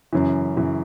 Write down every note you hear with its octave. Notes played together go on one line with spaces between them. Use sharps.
F#2 C#3 E3
F#2 C#3 E3